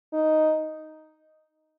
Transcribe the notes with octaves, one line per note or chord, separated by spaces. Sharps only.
D#4